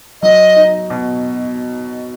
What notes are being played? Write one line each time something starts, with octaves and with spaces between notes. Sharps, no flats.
F#3 D#5
D#4
B2